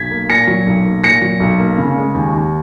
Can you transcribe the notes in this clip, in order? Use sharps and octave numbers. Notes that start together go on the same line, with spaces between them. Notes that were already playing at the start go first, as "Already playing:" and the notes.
Already playing: B1 G#6 B6
A#3
A#2 A#6 C#7
F#3
B1
A#3
A#2 A#6 C#7
F#3
B1
A#3
C#3
G#3
D#2
D#2